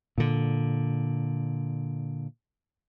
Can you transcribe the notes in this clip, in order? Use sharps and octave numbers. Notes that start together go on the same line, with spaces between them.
A#2 D3